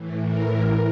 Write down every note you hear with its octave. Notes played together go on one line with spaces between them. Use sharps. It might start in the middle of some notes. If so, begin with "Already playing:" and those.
Already playing: A2 E3
A#4